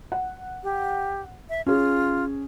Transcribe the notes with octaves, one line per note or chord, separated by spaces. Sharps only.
F#5
G4
E5
C#4 F4 G#4